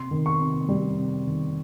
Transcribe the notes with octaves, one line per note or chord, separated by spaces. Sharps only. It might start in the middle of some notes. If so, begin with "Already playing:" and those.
Already playing: C3 C6
D#3
C#6
C3
G3
C3
D#3